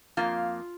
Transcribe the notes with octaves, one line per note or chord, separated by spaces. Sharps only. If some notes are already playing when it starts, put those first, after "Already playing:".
F2 D#3 A#3 F4